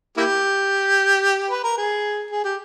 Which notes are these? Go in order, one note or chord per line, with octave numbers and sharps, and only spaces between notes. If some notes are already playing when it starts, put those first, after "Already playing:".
A#3 E4 G4
B4
A#4
G#4
G#4
G4